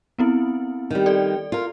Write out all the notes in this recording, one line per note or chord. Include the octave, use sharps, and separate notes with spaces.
B3 C4 E4
D#3 G3
A4 D5
F4 A#4